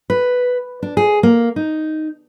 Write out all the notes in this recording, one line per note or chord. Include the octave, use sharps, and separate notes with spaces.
B4
D4
G#4
A#3
D#4